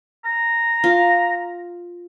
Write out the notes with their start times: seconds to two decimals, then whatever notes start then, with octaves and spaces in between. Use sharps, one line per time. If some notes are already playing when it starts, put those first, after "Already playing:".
0.25 A#5
0.84 F4